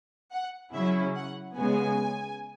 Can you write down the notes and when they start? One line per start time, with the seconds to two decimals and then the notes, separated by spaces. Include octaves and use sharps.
0.32 F#5
0.74 C#3 F#3 C#4 E4 E5
1.16 F#5
1.58 C#3 G#3 B3 G#5